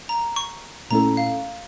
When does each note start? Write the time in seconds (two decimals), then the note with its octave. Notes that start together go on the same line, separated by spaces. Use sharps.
0.09 A#5
0.36 C#6
0.90 A#2 A3 C#4 E4 A4 A#5
1.17 F5